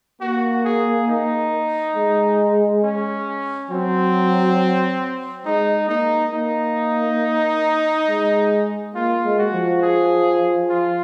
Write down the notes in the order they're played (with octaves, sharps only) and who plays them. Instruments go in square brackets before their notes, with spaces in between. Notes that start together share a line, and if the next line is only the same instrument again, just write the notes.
[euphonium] A#3 [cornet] F#4
[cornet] G#4
D#4
[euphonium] G#3
[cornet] C#4
[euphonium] F#3 [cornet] C4
[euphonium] G#3 [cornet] D#4
[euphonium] A#3 [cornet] D#4
[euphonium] A#3 [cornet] D#4
[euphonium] G#3
[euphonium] A#3 [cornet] F4
[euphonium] G#3
[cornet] F#4
[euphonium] F3
[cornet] G#4
F4